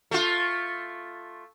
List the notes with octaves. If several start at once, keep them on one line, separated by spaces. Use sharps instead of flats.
A3 F4